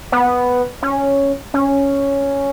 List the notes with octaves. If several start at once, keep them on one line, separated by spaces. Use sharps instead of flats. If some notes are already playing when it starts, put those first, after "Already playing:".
B3
C#4
C#4